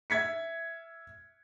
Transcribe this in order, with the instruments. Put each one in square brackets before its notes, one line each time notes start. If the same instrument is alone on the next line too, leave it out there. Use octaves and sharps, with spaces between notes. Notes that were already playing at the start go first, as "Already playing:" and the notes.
[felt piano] E5 G#6 B6 C#7